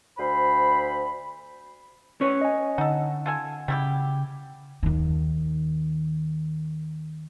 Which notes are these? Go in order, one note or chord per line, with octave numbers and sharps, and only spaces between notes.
D2 C5 B5
C#4 B4 C#5
D#5 G#5
D3 D#4 A4 F#5
F4 A4 G#5
C#3 G3 E4 G4
D#2 D#3